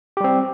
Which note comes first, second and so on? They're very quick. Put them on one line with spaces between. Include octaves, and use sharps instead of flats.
G4 G3 C4